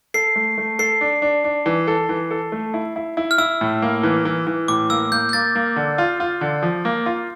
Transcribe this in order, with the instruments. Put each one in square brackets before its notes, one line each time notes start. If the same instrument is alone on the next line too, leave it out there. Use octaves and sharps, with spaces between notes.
[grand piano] A4 [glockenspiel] C7
[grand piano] A3
A3
[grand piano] A4 [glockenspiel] C7
[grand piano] D4
D4
D4
E3
A4
E3
A4
A3
E4
E4
E4
[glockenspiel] F6
[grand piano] E4 [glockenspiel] E6
[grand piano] A2
A#3
E3
E3
E3
[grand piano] A2 [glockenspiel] D6
[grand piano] A#3 [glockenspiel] E6
[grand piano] A#3 [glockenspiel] G6
[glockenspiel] G6
[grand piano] A#3 [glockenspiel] A6
[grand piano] A#3
D3
F4
F4
D3
F3
A#3
F4